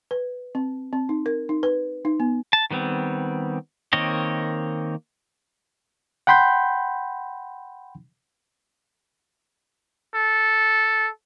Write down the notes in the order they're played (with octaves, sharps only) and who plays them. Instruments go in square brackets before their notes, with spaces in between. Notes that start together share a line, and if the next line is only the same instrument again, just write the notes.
[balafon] B4
C4
C4
D#4
A#4
D#4
B4
D#4
B3
[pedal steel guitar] A5
D#3 G3 B3 C4
D#3 A#3 C4 C#5 D#5
[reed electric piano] F#5 G5 B5 C6 G6
[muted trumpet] A4